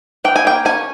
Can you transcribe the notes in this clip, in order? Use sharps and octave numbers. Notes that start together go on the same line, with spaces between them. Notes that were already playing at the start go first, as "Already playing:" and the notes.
E3 G5
G#5
A#3 G5
C#4 G#5